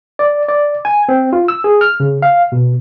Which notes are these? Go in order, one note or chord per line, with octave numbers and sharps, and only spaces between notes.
D5
D5
G#5
C4
F4
E6
G#4
F6
C#3
F5
B2